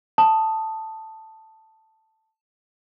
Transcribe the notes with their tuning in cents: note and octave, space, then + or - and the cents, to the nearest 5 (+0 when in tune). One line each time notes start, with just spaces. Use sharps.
A5 +5 D#6 +0